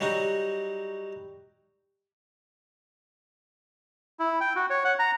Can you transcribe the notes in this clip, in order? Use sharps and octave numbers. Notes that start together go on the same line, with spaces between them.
F#3 G3 D#4 F#4
E4
G5
F#4
C#5
F#5
A#5